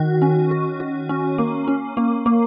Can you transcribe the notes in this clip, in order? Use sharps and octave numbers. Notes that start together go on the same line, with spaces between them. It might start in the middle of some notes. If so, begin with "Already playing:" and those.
Already playing: D#3 F#4
C#4
F#4
F#4
C#4
A#3
C#4
A#3
A#3